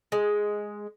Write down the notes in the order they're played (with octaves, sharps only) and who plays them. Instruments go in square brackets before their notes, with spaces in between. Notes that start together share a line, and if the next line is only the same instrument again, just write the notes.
[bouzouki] G#3